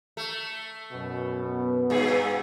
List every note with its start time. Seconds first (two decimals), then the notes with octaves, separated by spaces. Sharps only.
0.17 A3
0.93 F#2 B2
1.43 B3
1.90 G2 B2 G#4